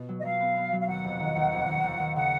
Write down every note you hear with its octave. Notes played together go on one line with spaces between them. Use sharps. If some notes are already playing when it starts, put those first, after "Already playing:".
Already playing: B2 B3
F#3
D#5
F#3 F5
B3
B3
F#3
F5
D#2 F#5
F1
D#3
D#2
F1
D#2
D#2
D#2
C#3 F#5